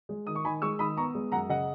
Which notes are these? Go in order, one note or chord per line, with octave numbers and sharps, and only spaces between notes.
G#3
D#3 D#6
C#6
D#3 G#5 B5
G#3 C#6 E6
D#3 B5 D#6
B3 A#5 C#6
G#3
F#2 F#5 A#5
C#3 D#5 F#5